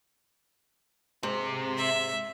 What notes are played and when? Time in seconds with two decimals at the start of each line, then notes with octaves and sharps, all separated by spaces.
1.23 G#2 C3
1.78 E5